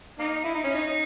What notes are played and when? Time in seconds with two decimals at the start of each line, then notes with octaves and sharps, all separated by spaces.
0.19 A#3 D#4
0.44 E4
0.55 D#4
0.64 C#4
0.74 D#4